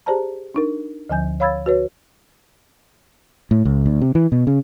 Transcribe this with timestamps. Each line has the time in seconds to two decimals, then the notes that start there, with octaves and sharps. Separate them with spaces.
0.06 G4 G#4 C5 D5 A5 A#5
0.54 D4 D#4 A#4
1.09 D2 D3 F3 G#5 G6
1.40 C#5 F5 B5 E6 G#6 A6
1.66 F#4 B4 C#5
3.51 A2
3.65 C#2
3.86 D2
4.01 C3
4.15 E3
4.32 B2
4.47 C#3